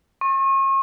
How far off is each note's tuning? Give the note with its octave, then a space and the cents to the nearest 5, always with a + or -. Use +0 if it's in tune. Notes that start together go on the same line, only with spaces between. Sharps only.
C#6 -40